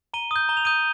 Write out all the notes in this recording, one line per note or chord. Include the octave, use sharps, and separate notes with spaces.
A#5 D#7 G7
D#6 G6
A#5 G7
F7
D#6 G6 D#7 G7